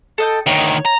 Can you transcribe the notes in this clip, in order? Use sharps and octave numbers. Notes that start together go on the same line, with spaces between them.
A4 D#5 G5
D2 D#3 C#5
A#5